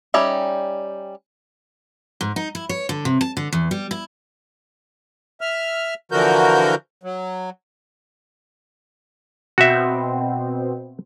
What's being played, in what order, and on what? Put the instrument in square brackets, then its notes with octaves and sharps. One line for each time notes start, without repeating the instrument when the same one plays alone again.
[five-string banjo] G3 C#4 D#4 E5
[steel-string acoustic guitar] G#2
D#4
E4
C#5
D3
C3
A5
D3
E2
G3
E4
[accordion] E5 F6
D3 E3 F3 F#4 A#4 G6
F#3
[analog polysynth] B2 C4 [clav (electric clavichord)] F#4 E5